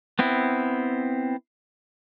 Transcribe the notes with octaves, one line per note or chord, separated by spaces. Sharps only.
B3 C4 E4